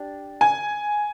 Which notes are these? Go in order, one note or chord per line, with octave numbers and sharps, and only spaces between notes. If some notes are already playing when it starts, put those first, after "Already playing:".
Already playing: D4 G4
G#5